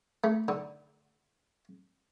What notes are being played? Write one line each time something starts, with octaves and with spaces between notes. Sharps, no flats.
A3
D3